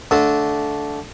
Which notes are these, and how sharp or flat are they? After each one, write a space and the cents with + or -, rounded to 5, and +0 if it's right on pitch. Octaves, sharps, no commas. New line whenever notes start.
D3 -15 A3 -10